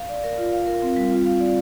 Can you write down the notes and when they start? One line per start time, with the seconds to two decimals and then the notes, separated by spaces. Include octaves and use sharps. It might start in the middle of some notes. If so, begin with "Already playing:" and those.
Already playing: F5
0.09 D5
0.23 A#4
0.38 F4
0.53 F5
0.67 A#4
0.82 C4
0.96 G3
1.11 F4
1.26 F5
1.40 D5